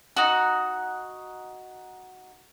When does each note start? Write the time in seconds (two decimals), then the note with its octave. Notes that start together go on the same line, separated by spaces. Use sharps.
0.17 D#4 F#4